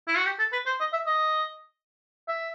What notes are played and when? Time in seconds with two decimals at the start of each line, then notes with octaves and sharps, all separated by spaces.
0.08 E4
0.17 F#4
0.26 G4
0.39 A4
0.52 B4
0.66 C5
0.80 D#5
0.93 E5
1.06 D#5
2.28 E5